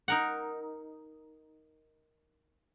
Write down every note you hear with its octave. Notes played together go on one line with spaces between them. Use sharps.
D#4 A#4 F#5